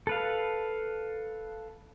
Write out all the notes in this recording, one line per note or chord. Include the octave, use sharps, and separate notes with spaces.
A4 B4 F5